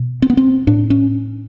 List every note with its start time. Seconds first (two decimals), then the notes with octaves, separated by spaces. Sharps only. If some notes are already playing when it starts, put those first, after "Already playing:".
Already playing: B2
0.22 C4
0.30 B3
0.37 C4
0.67 A2 D4
0.90 C#4